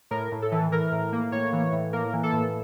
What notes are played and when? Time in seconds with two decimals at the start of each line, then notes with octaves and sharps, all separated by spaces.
0.11 A2 A#4
0.32 A2
0.42 A4
0.52 E3
0.71 E3 A#4
0.92 A2
1.13 A#3
1.32 A2 C#5
1.53 E3
1.72 A2
1.93 A#3 A#4
2.13 E3
2.23 A4
2.33 A2